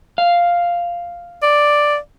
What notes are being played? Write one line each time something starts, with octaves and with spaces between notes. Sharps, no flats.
F5
D5